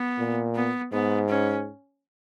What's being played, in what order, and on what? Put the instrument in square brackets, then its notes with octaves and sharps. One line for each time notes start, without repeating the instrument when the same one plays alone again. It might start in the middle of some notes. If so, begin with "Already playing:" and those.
Already playing: [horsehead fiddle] B3
[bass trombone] A#2
[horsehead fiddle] B3
[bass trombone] G#2 [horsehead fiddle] B3
[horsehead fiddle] C#4